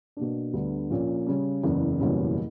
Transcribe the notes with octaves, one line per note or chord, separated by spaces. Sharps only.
B2 A#3 D4
D2 D3 G3 B3
A#1 A#2 A#3 C#4
C#3 G3 C#4
F#1 E2 C#3
F#1 E2 B2 G3 C#4